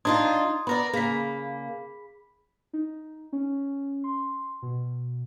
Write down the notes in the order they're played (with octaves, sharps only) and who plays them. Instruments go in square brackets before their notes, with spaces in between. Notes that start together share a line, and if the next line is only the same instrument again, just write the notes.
[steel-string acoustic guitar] D4 D#4 F4 [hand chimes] C6 D#6 G#6
[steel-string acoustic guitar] B3 A#4 D5 [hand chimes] B5 A#6
[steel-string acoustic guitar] C#3 A#3 [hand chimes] G#4 B5 B6
[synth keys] D#4
C#4
C6
B2